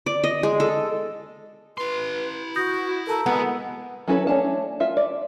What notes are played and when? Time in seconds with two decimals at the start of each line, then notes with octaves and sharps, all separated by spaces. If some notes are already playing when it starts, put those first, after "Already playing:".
0.06 D5
0.24 D#5
0.43 G#3
0.60 A4
1.78 E4 B4 C6
2.56 F#4 D#6 G6 A#6
3.07 A4 A#4 A5 A#5
3.26 G#3 B3
4.08 F#3 C#4 E4 A4 B4
4.27 A3 C#4 D4 A5
4.80 F4 E5
4.97 D5